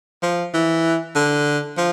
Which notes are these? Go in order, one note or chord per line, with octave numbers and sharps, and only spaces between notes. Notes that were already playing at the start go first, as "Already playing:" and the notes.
F3
E3
D3
F3